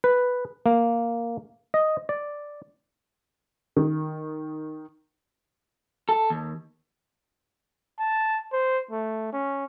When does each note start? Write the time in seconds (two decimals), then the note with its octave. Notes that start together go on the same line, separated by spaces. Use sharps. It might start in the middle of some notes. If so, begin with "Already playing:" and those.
0.04 B4
0.66 A#3
1.74 D#5
2.09 D5
3.77 D#3
6.09 A4
6.30 D#2
8.00 A5
8.53 C5
8.91 A3
9.33 C#4